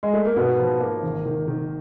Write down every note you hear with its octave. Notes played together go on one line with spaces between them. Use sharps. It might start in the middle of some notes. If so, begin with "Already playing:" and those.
G#3
A3
A#3
G#2 B2 B3
F3
A#3
G#1
D#3
D#3